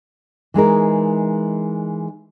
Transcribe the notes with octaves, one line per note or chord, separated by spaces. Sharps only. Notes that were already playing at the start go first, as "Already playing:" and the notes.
E3 G#3 D#4 A#4